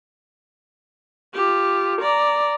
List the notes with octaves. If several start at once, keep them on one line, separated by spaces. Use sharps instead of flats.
F4 G4
D5 A#5